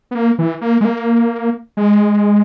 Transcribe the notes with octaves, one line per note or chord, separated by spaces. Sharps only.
B3
A#3
E3
A#3
G#3
A#3
G#3